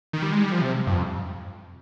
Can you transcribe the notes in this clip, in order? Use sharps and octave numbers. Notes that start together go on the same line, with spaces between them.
D#3
G3
G#3
G3
F3
C3
G2
F2